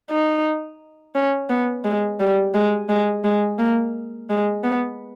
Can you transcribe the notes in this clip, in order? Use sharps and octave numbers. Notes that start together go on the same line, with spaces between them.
D#4
C#4
B3
G#3
G3
G#3
G#3
G#3
A#3
G#3
B3